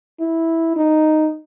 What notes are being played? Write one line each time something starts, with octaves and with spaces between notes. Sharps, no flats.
E4
D#4